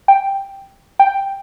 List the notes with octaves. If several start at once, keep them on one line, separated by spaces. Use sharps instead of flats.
G5
G5